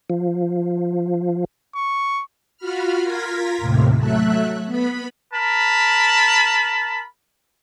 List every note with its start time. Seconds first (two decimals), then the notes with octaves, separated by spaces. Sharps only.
0.10 F3
1.75 C#6
2.57 F4 F#4 B5 F6
3.03 F4 A#4 G#6 A#6 B6
3.58 D#2 A2 C3
3.96 F#3 A3 E5 F#6
4.66 B3 B5
5.34 A#4 A5 B5